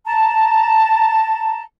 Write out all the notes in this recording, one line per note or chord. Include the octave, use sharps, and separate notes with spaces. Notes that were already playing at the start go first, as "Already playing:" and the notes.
A5 A#5